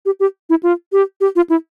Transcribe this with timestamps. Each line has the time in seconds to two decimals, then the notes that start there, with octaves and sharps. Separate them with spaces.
0.06 G4
0.20 G4
0.50 E4
0.63 F4
0.92 G4
1.21 G4
1.36 F4
1.50 E4